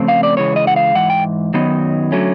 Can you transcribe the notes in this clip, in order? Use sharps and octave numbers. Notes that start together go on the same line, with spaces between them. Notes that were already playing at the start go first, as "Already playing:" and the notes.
Already playing: C#3 F3 A3 C4
F5
D5
C#3 E3 G#3 C#5
D#5
F#5
F5
G#2 E3 F#5
G5
F#2 D#3 F#3 B3 D#4
D3 F#3 A3 C#4